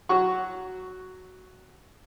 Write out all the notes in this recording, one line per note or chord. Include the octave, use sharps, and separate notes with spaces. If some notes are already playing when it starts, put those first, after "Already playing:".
F#3 F#4 C#6